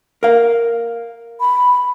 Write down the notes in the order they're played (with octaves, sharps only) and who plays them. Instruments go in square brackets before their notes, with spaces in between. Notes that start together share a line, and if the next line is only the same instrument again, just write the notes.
[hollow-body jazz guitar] A#4 F5
[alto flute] B5